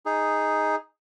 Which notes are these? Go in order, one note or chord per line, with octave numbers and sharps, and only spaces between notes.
D#4 G#4